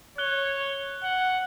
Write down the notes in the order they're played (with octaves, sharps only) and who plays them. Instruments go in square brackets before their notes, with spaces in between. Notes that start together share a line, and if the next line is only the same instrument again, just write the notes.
[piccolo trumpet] C#5 [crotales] F#6 G7
[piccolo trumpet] F#5